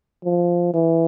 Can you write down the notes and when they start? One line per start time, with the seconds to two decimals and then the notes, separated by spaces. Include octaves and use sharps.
0.25 F3
0.74 E3